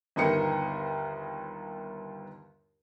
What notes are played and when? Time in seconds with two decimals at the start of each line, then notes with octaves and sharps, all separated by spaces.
0.16 G1 D#2 B3 D#4 A#4 C#7